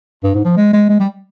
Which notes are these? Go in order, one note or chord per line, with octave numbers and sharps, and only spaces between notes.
G2
G#2
F3
G#3
G#3
G#3
G3